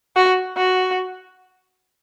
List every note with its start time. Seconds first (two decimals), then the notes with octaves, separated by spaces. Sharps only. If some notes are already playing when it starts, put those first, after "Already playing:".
0.16 F#4
0.57 F#4